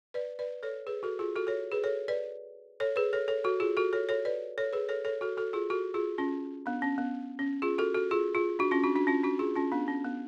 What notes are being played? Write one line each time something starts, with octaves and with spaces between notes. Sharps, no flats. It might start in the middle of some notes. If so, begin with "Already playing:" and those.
B4 D5
B4 D5
A4 C#5
G#4 B4
F#4 A4
F4 G#4
F#4 A4
A4 C#5
G#4 B4
A4 C#5
B4 D5
A4 C#5
G#4 B4
A4 C#5
A4 C#5
F#4 A4
F4 G#4
F#4 A4
A4 C#5
A4 C#5
B4 D5
A4 C#5
G#4 B4
A4 C#5
A4 C#5
F#4 A4
F#4 A4
F4 G#4
F#4 A4
F4 G#4
C#4 F4
B3 D4
C#4
B3
C#4
F4 G#4
F#4 A4
F#4 A4
F4 G#4
F4 G#4
D4 F#4
C#4 F4
D4 F#4
D4 F#4
C#4 F4
D4 F#4
F4 G#4
C#4 F4
B3 D4
C#4
B3